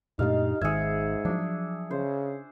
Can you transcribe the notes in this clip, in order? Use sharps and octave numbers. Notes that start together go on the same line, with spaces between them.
F#2 A#2 A3 D4 D#4 G4 D#5 F5
G#1 G#2 D#3 G#4 E5 G#6 C#7
F3 F#3 D4
C#3 C5